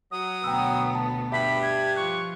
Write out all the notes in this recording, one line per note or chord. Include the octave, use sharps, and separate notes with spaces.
F#3 D#6
D2 B2 B3 G5 A#5 E6
A5
G2 D4 G4 E5 B5
G#6
F3 F4 C#6 F#6